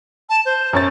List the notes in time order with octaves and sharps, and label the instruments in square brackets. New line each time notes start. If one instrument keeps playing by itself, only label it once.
[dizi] A5
C5
[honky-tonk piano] F#2 C#5 A6